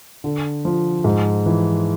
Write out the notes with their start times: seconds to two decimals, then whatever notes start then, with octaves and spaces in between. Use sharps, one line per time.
0.24 D3
0.65 F3
1.04 G#2
1.46 E3